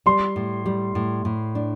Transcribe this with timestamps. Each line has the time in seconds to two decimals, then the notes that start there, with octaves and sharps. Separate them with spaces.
0.06 G3 C6
0.36 A2
0.66 G3
0.95 A2
1.25 A2
1.55 D4